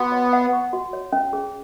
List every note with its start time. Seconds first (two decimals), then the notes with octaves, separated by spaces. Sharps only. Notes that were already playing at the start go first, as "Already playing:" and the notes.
Already playing: B3 F#4
0.12 C#5
0.33 F#5
0.53 C#6
0.73 F#4
0.93 C#5
1.13 C#4
1.33 G#4